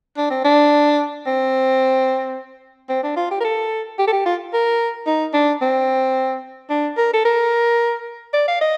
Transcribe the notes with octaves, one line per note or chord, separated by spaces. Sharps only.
D4
C4
D4
C4
C4
D4
F4
G4
A#4
A4
G4
A4
G4
F4
A#4
D#4
D4
C4
D4
A#4
A4
A#4
D5
F5
D#5